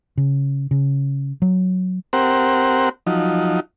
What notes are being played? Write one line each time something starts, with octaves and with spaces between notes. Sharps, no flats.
C#3
C#3
F#3
C4 G4 A#4 C5 F#5
F3 F#3 D#4